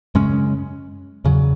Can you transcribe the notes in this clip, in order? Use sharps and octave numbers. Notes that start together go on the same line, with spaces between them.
F#2 C#3 G#3 C#4
E2 C#3 F#3